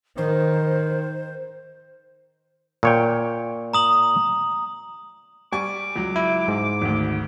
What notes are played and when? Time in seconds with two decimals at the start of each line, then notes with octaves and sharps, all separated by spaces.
0.18 D#3 C5
2.83 A#2 C#5 G5
3.73 A#5 D#6 F#7
5.52 G3 G#5 C#6 D6
5.96 C#2 F#3
6.16 E4
6.48 G#2
6.81 G#1 D2